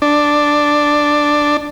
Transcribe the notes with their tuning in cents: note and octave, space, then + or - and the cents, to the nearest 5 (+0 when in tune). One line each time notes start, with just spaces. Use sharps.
D4 +5